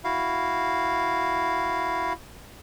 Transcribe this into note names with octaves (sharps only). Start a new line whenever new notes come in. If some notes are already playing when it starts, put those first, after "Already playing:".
E4 F#4 F5